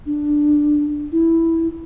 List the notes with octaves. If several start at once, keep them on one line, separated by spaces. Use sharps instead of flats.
D4
E4